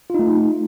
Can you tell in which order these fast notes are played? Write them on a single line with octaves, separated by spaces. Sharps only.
F4 D#4 A3